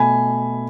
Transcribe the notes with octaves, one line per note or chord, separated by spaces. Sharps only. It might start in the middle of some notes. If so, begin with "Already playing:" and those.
Already playing: B2 A3 G#5 B5